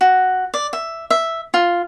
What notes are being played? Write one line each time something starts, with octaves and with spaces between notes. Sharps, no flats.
F#4
D5
E5
E5
F4